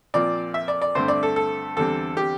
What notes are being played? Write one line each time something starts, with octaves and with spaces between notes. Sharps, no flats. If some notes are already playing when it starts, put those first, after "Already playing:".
A#2 F3 C4 D5
E5
D5
D5
G2 D3 A3 C4 C5
D5
A4
A4
E2 D3 G3 C4 A4
G4